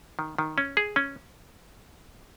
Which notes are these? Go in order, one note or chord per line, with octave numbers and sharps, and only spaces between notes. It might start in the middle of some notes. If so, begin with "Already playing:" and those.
D#3
D#3
C#4
G#4
C#4